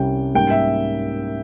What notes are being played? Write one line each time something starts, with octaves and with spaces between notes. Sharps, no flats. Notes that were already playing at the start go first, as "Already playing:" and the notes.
Already playing: C2 C3 G3 C#4 G5
G#2 G3 A#3 C#4 G5
E5